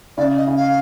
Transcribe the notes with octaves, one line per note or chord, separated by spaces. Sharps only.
C#3 D5
D#5
C#3
F5